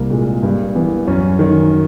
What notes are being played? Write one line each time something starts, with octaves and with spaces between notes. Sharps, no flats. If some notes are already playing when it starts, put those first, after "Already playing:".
Already playing: C2 A#3
A#2 G#3
G2 A#3
E3 B3
F#2 C#4
D#3